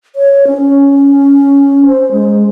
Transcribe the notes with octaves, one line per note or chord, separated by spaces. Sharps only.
C#5
C#4
C5
G#3